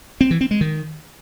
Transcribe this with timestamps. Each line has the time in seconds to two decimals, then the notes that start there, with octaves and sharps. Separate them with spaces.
0.21 C4
0.31 E3
0.41 C4
0.51 G#3
0.61 D#3